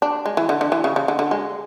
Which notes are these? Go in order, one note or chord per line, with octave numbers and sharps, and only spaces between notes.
D4
G#3
E3
D3
D3
E3
C#3
C#3
D3
D3
G#3